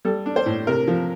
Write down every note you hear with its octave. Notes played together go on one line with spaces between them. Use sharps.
G3 A4
D4
C5
A2
C3 A#4
F3